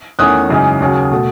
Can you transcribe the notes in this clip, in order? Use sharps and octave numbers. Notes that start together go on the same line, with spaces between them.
E2 D#3 A3 C#4 D#6 F#6
F#2 C#3 E3 G#3 D#4
D#2 C#3 F#3
B2 A3